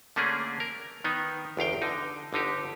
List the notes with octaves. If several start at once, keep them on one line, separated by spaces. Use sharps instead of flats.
D3 A3 A#3 C#4 D4 G#4
A#4
D#3 B3 D#4
G1 E2 F5 G5
D3 D#4
G1 D3 D#4 G4